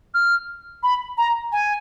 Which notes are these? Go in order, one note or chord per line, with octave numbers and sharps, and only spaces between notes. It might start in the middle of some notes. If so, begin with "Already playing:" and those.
F6
B5
A#5
G#5